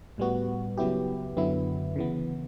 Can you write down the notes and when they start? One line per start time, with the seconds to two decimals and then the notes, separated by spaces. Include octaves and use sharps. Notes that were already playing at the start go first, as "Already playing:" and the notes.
0.18 A2 G3 B3 F#4
0.77 C#3 F#3 B3 E4 G4
1.37 F#2 D3 F#3 B3 E4
1.96 C#3 E3 B3